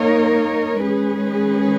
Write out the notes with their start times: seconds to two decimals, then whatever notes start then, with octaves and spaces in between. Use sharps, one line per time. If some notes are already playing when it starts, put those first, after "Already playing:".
Already playing: A#3 D#4 A#4 C#5
0.83 D#3 G#3 C#4 G#4 B4